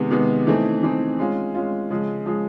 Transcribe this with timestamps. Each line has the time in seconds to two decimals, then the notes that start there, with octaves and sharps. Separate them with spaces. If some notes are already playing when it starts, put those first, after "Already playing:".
Already playing: C3 D#3 G#3 B3
0.11 C3 D#3 G#3 B3
0.47 E3 A3 C4 D#4
0.83 E3 A3 C4 D#4
1.19 G#3 C#4 F4
1.54 G#3 C#4 F4
1.90 C#3 F3 G#3
2.26 C#3 F3 G#3